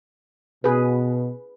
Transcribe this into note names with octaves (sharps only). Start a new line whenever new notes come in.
B2 G#4 B4